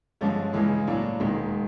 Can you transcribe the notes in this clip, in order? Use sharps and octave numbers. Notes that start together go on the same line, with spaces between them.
G2 D3 F3 G#3 C#4
C#2 C#3 E3 G#3
A2 F#3 A#3 D4
E1 D#2 D#3 G#3